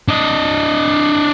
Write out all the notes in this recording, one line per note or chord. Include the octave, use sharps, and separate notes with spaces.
D4 D#5